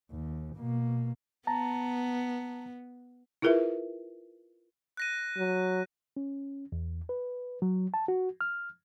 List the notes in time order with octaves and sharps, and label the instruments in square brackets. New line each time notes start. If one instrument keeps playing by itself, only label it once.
[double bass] D#2
B2 A#3
[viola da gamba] B3 [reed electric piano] A5 A#5
[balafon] E4 F4 G#4 A#4 B4 E5
[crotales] F#6 A#6 D#7
[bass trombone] F#3
[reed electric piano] C#4
E2
B4
F#3
A5
F#4
F6